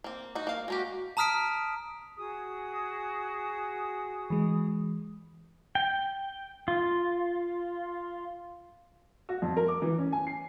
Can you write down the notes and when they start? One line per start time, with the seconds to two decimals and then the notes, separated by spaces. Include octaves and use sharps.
0.04 A#3 C4
0.35 D#4 F#4
0.47 A#3 F5
0.68 G#3 A#3 F#4 G4
1.17 A5 A#5 D#6 F6 B6 D7
2.16 F#4 G#4 D#6
4.30 E3 G#3
5.75 G5
6.68 F4
9.29 F#4
9.42 F2
9.57 A#4
9.68 D6
9.82 E3
9.98 C#4
10.12 G#5
10.27 C7